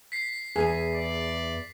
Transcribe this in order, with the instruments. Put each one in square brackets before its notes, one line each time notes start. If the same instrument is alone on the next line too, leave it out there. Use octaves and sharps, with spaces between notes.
[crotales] B6 C7
[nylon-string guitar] E2 G#5 [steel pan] G#4
[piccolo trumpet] D5